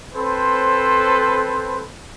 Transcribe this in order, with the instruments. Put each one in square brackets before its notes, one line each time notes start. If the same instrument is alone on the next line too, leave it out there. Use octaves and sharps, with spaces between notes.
[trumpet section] C4 A4 B4 C5